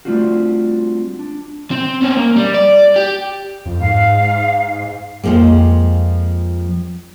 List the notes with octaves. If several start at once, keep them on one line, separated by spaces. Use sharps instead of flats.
G3 A3 C4 D4 F4 F#4
D4
C4
C4 C#4
A#3
G3
D5
G4
F2
G#2 F5
F2 G#2 F3 G#3 A#3